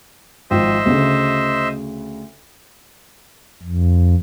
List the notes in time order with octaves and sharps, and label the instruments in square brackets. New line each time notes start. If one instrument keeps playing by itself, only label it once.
[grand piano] G#1 F3 G5 [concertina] C5 D#5 E5
[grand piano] D2 C#3
[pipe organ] F2